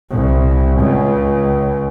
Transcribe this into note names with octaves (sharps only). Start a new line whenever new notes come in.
C2
C#2